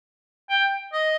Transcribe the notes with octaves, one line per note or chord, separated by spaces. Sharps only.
G5
D#5